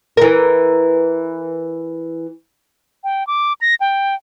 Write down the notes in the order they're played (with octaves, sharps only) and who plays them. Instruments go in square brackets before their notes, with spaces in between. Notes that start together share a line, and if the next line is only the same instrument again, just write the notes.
[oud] E3 A#4
[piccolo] G5
D6
A#6
G5